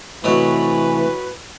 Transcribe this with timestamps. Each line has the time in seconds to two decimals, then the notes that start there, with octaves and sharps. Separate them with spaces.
0.24 C3 E3 F#3 A3 E4 B4 D#5